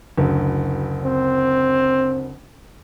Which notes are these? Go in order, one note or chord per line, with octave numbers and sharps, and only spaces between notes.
F#1 D2
C4